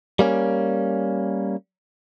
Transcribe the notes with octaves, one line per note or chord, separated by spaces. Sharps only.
G3 A#3 C#4